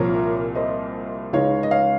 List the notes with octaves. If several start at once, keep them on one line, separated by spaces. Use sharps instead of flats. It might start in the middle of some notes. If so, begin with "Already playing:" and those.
Already playing: C2 A#2 F3 A#4 C#5
C5 D#5
C#2 C#3 G#3 D#4 C#5 F5
D#5
C#5 F5